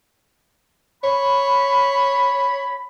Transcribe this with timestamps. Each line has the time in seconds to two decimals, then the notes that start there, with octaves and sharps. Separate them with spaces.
1.04 C#5 B5